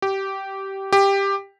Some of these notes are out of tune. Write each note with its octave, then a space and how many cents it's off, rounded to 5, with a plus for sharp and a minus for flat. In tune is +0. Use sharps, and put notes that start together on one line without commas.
G4 -15
G4 +10